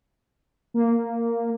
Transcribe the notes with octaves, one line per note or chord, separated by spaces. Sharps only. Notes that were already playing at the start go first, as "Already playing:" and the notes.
A#3